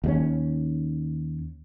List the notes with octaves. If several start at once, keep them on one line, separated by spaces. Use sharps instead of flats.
D#2 G3 C#4